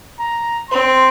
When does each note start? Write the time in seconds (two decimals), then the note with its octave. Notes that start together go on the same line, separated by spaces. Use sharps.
0.20 A#5
0.70 C4 C6